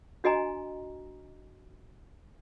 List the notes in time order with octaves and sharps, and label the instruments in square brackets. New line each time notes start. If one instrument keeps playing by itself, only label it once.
[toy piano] D4 F#4 D#5 G#5 A#5